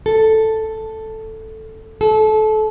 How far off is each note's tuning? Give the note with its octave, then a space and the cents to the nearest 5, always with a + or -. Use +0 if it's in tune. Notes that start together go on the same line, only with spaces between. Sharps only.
A4 +0
A4 -25